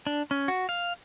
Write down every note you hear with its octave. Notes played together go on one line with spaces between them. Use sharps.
D4
C#4
F#4
F5